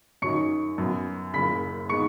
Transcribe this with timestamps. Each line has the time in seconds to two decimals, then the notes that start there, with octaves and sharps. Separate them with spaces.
0.22 F#2 F#3 D#4 C#6 C#7
0.78 F#2 F#3 B3
1.34 F#1 F#2 C#3 B5 B6
1.89 G#3 B3 D#4 C#6 C#7